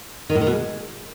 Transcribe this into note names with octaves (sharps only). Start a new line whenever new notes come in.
D#3
A2
D#3
B2
G#3